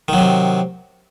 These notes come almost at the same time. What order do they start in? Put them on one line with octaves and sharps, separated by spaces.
D#3 F#3 C3